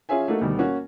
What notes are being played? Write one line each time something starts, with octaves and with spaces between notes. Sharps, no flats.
C#4 F4 G#4 C#5 E5 G#5
A3 A#3 D#4 F#4 A4
D2 B2 D#3 G3
A#3 C#4 F#4